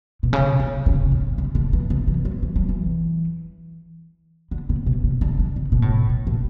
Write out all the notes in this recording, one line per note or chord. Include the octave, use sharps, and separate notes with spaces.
B2
C#3
C#3
C#3
A2
C#3
D3
E3
C#3
E3
F#3
E3
F#3
E3
D3
C#3
B2
C#3
D3
D3
C#3
B2
A2
B2
A2